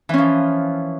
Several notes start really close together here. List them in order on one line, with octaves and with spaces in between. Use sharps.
E3 C#4 F3